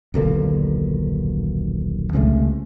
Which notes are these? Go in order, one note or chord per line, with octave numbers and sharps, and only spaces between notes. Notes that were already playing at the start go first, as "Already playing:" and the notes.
D#1 B1 D3 A#3
C#2 C3 G#3 A3